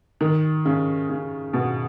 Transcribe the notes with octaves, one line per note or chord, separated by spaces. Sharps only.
D#3
C#3
C#3
B2